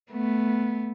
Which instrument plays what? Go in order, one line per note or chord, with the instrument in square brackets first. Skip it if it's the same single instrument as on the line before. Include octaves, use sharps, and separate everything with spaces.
[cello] A3 B3